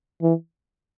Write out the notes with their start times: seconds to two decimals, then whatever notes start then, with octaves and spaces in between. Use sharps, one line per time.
0.22 E3